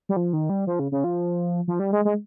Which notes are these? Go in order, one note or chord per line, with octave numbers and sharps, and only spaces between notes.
G3
F3
D#3
G3
F3
C#3
C#3
F3
F3
G3
G#3
G#3